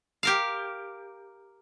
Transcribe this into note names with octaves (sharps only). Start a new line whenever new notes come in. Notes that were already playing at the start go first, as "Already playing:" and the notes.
G4 A#4 F5